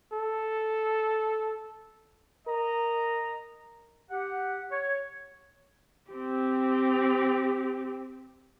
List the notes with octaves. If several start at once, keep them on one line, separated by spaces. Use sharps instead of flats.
A4
A#4 D#5 A#5
G4 F#5
C#5
C4 G4